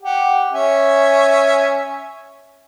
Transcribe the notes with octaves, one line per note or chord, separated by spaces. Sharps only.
G4 F#5
C#4 E5 G#5